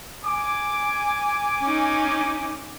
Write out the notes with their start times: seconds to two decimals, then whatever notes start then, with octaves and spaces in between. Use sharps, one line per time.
0.25 G#5 D6
1.62 C#4 D#4